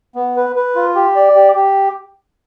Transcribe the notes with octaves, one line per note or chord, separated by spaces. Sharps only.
B3
B4
B4
F4
G4
D5
G4
G4